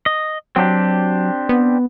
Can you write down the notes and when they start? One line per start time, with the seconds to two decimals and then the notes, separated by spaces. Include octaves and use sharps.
0.06 D#5
0.56 F#3 C4 D4 G4
1.49 B3